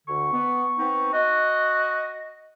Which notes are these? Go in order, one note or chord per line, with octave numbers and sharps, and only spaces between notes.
D2 D3 C#6
B3
B3 C4 D#4
F#4 D#5